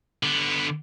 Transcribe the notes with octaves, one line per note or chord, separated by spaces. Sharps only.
D3 B3